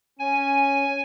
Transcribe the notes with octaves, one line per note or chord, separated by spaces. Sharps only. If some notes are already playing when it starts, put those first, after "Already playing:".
C#4 G#5